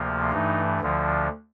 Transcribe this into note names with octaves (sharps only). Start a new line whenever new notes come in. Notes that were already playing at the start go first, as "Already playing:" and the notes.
Already playing: D2 C3 F3 A#3
G2 E3 A3 D#4
D2 D3 F3